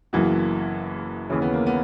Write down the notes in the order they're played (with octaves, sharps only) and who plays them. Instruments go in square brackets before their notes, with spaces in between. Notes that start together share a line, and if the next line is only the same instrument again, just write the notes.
[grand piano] F#1 F#2 E3 B3 F#4 [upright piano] A#3
[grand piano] D#2 C#3 E3 [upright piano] C#4
[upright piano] B3
A#3
B3